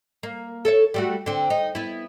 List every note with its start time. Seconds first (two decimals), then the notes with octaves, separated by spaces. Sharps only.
0.23 A#3
0.65 A4 C#5 E5
0.94 G3 A3 F#4
1.26 D3 C4
1.50 D#4
1.75 B3 E4